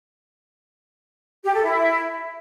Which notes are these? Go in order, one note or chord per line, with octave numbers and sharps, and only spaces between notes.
G4
A4
E4